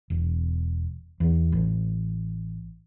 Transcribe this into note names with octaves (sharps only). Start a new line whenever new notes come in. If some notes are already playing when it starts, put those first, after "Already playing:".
E1
E2
A1